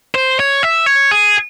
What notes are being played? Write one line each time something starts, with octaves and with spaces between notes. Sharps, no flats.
C5
C#5
E5
C#5
G#4